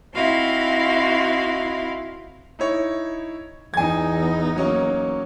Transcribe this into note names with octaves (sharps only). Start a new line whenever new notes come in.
C4 D#4 E4 F#4 F5 C6
D#4 E4 C#5
E2 D#4 G#5 G#6
F#3 A#3 C#4